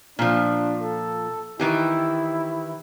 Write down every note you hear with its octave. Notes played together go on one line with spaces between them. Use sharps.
A#2 F3 D4
A4
D#3 E3 E4 G4